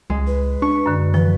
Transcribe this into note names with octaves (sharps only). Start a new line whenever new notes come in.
C#2 G#3
B4
D4 C#6
F#2 D3
E3 F3 B4